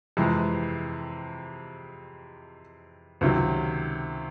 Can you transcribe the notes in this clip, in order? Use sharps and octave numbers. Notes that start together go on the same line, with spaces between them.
F2 C3 E3 G#3
C#2 C3 D#3 F#3